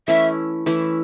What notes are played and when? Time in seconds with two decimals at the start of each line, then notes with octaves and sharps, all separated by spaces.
0.08 E3 A3 C#4 E4 E5
0.66 E3 A3 C#4 E4